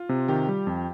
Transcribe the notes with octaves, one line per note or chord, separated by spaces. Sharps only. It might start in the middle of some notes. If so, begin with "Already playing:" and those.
Already playing: F4
C3
D#3 G4
G3
F2